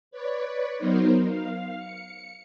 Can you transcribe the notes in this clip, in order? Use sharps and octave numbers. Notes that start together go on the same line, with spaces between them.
B4 C#5 D5
F#3 B3 D#4 A#4 C5
F5
C#7